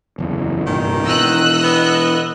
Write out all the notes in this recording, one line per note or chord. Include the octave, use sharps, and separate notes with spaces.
F#1 E2
C2 G2 A#2 D#3
B2 E3 D#5 E6 F#6
B3